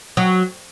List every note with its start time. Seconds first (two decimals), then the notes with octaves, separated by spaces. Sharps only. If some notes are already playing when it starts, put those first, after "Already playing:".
0.17 F#3